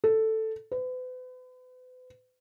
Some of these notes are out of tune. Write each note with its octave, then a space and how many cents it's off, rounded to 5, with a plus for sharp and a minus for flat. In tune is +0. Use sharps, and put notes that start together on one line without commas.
A4 +5
B4 +40